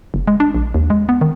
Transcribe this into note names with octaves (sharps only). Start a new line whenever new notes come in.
F#1
G#3
D4
A#1
D#2
G#3
B3
D#3